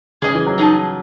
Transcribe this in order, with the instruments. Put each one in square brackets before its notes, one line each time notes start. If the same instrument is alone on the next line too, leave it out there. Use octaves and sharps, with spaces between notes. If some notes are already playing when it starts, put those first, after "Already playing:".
[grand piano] C#3 [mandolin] G#4 D#5 G#5
[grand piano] E3
F#3
[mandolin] D#4 G#4 D#5 A5